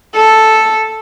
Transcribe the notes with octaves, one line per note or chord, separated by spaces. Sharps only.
A4